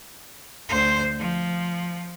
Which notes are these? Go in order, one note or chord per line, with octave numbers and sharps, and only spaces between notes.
D2 C5
F3